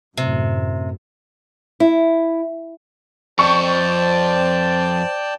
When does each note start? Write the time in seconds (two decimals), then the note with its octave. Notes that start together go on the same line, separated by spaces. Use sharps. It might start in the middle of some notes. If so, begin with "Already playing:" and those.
0.17 F#2 A2 C3
1.80 E4
3.39 F2 C5 D5 G5 A5 C#6